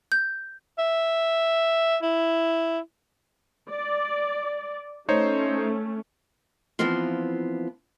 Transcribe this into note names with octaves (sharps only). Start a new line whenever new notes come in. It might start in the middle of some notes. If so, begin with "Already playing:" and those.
G6
E5
E4
D5
A3 C#4 D#4 C5 C#5
E3 F3 B3 C4 F4